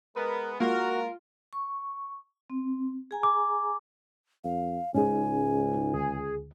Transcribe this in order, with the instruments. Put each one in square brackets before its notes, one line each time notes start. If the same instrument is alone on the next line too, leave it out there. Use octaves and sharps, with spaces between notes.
[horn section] G#3 B3 [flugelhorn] A#4 [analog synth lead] B4
[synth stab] G#3 A#3 [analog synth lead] F4 [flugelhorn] F#4 [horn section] A#4
[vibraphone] C#6
C4
G#4 G#5 A#5
[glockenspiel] D6
[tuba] F2 [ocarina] F5
[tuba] C#2 [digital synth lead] G#2 [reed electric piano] C#4 D#4 G#4 [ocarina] G#5
[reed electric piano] D2 [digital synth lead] G#4